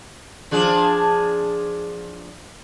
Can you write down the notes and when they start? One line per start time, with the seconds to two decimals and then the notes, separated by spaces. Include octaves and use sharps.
0.51 F3 D4 G#4